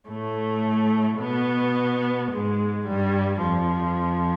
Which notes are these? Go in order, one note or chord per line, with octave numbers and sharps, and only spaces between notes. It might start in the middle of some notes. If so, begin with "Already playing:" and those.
A2 A3
B2 B3
G#2 G#3
G2 G3
F2 F3